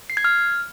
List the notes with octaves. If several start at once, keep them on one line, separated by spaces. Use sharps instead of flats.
C7
G#6
F6